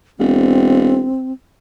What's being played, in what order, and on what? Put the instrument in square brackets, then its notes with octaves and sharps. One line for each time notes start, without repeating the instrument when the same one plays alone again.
[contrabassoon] E1 [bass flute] C4